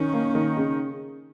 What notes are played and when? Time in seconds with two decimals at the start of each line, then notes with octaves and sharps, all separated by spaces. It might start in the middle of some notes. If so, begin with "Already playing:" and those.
Already playing: D#3 C#4
0.14 A#3
0.35 D#3
0.57 C#3